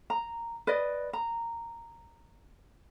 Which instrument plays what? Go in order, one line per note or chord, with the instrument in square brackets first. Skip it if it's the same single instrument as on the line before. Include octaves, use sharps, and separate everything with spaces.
[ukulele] A#5
B4 D5 D#5
A#5